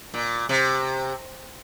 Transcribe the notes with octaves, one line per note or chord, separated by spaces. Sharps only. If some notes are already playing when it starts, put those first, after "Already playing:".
A#2
C3